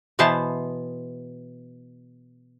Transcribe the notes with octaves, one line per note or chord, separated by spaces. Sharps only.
B2 E3 B3 C5 A5